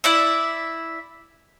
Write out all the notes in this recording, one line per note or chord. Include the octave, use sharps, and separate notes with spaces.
E4 D5 E5